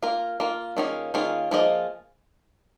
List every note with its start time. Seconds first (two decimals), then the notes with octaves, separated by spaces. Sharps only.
0.02 A#3 F4 A#4
0.40 A#3 F4 A#4
0.77 D#3 A#3 C#4 F4 G#4
1.14 D#3 A#3 C#4 F4 G#4
1.51 F3 A#3 F4 G#4 D#5